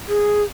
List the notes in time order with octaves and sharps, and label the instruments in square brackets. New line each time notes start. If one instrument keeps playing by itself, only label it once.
[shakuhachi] G#4